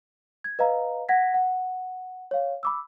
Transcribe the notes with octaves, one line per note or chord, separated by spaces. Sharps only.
G#6
B4 D#5 F5 A#5
F#5 G#6 A#6 B6
F#5
C#5 F5
B5 D6 E6